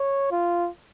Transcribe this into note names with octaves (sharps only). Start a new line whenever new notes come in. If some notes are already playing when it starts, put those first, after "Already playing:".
Already playing: C#5
F4